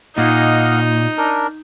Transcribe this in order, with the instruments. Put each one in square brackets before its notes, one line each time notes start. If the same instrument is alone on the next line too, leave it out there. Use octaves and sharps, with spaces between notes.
[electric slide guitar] A#2 [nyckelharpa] D#4 [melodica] D#5 F5 F#5
[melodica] D4 A#4